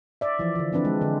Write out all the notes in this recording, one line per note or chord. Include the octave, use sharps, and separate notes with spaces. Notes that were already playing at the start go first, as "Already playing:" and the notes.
D5 E5
E3 F3
D3 E3
F3 C4 D4 B4
G#3
D3